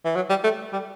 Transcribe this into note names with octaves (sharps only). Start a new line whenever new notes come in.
E3
F#3
G3
A3
G3